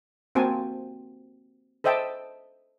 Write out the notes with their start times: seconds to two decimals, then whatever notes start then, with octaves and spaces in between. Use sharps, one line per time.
0.35 A#3 C4 F#4 G#5 A5
1.84 A4 C5 D#5 E5 G5 A5